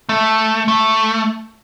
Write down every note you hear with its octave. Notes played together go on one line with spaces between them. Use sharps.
A3
A3